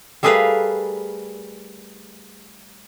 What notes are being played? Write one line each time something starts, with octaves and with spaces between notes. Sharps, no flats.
G3 A3 G#4 A#4 B4 F5